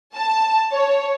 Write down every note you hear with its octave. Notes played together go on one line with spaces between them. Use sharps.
A5
C#5